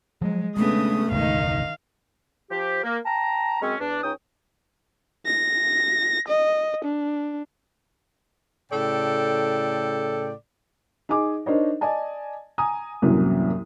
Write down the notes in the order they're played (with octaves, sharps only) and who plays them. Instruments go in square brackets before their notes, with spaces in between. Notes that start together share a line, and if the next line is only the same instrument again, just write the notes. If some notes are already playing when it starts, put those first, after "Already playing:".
[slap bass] F3 F#3 [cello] G#3
[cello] C#3 B3 [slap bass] G#3 D4 [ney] A3 [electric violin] D#6
[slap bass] E1 C#2 G2 [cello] D#3 D#4 [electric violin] F5
[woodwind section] F3 G4
A#3
G5 A5 A#5
F#2 G#3 C4 C#4
E2 D4
C#2 C#4 D#4 G5 D#6
[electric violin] A#6
D#5
D4
[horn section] A2 C#3 A4 D5 G5
[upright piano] D#4 G#4 G#5 D6
D4 D#4 A#4 C5 C#5 D#5
D5 D#5 G#5 A5
G#5 A#5 D#6
C2 F#2 A2 E3 F#3 A#3